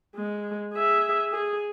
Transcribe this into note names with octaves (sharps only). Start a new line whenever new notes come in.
G#3
G#4 E5
G#4